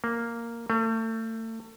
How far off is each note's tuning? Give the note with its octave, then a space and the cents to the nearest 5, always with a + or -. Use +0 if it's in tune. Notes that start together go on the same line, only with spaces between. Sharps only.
A#3 -5
A3 +35